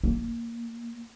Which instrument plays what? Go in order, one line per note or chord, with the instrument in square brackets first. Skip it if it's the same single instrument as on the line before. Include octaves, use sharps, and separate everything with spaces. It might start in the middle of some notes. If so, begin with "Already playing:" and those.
[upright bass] A#3